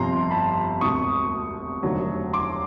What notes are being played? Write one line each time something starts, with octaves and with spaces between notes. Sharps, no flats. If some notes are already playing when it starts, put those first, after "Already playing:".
Already playing: G1 F2 C3 F3 A#5 C6
A5 B5
E1 D2 C3 C#6 D#6
F1 D#2 D3 F#3
C6 D6